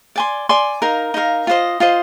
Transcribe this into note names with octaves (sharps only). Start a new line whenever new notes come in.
D5 G#5 C6
D5 G#5 C6
D#4 A#4 F5
D#4 A#4 F5
F4 C5 D#5
F4 C5 D#5